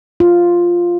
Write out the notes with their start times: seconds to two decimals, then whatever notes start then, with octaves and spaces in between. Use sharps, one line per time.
0.20 F4